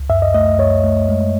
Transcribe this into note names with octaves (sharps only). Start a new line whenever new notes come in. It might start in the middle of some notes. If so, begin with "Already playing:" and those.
Already playing: C#2
F#2 E5
D#5
A3 D#5
F#2 C#5
A3
G#3